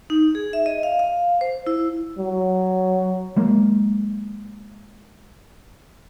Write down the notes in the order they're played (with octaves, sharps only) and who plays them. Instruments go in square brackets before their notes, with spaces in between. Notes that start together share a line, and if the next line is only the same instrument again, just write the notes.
[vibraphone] D#4
G#4
E5
D#5
F5
F5
C5
E4
[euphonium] F#3
[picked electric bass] F#3 G#3 A#3